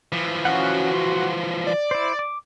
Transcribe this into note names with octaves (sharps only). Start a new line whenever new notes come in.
E3 F3
C#4 F#4 F5 F#5
C6
D5
E4 C5
D6